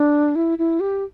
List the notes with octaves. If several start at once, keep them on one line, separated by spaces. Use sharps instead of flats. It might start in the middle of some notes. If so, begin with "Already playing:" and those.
Already playing: D4
E4
E4
G4